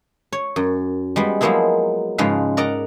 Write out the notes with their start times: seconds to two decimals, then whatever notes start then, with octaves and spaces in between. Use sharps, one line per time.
0.33 C#5
0.56 F#2
1.16 G3 G#3 B3
1.41 F3 F#3 G#3 A#3 B3 E4
2.18 G#2 C#3 F3 G#3 B4 F5
2.57 A#4 D5 D#5 F#5 A#5